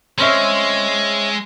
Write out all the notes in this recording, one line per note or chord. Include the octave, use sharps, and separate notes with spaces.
G#3 C4 C#4 E5